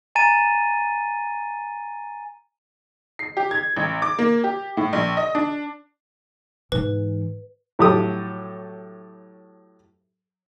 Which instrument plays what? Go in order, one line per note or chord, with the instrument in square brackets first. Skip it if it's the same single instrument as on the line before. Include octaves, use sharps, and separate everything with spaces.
[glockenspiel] G#5 A#5 A6 D#7
[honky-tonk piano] C7
G4
G#6
A1
D6
A#3
G4
A2
A#1
D#5
D4
[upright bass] G#2 E3 [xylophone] B4
[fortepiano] A2 F#3 G4 A4 D#6